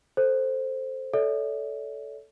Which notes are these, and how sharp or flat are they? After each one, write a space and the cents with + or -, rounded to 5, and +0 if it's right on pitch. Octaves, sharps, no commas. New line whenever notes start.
A4 +5 C5 +0
A4 +0 C#5 +45 E5 -45